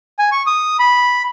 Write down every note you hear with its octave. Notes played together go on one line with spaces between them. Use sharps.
G#5
C#6
D#6
B5